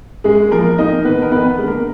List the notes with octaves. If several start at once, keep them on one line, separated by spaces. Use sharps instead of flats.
F#2 G#3 G#4
F3 G#3 A#3 A#4
F2 D#4 D#5
D#3 A#3 B3 B4
A#4
F2 B3 B4
D3 G#3
A#3 A#4